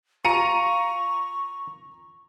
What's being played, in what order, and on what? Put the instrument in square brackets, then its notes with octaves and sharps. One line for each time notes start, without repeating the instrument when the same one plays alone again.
[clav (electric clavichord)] F4 [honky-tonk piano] A#5 C#7 D#7 [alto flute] C#6